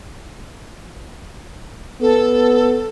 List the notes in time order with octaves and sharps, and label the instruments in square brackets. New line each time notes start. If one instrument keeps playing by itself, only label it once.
[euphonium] B3 [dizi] A4